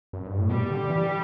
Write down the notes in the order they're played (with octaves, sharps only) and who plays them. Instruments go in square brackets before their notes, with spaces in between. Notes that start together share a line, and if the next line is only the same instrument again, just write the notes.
[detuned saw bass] F#2
G2
A2
[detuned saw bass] B2 [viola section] G3
[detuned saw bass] D3
E3